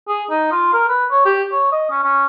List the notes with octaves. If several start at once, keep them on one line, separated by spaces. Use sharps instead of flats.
G#4
D#4
F4
A#4
B4
C#5
G4
C#5
D#5
C#4
C#4